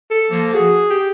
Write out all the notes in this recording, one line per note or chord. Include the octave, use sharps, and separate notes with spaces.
A4
F3 A#3
F#4 G#4
G4